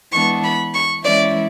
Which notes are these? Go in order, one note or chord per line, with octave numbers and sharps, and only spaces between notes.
E3 G#3 B3 D4 C#6
B5
C#6
E3 G#3 C#4 E4 D5